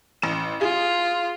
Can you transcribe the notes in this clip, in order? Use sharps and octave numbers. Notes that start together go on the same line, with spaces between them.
A1 E7
F4 G#4